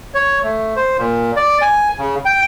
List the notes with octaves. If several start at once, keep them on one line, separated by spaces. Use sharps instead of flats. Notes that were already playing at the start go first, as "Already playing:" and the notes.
C#5
A3
C5
A#2
D5
G#5
C#3
G5